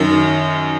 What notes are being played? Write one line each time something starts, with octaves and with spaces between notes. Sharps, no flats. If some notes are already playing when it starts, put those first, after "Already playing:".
Already playing: F#2 D#3